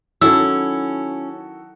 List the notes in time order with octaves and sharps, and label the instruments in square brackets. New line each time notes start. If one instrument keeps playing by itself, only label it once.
[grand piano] D#3 F#4 A4 [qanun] F#3 E4 A5 [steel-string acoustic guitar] C#4 [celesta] E6